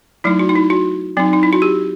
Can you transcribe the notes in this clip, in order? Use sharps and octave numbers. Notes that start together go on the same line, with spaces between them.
F#3 A3 D#4 E4
F#4
D#4
E4
F#4
F#3 C4 D#4
D#4
E4
F#4
G4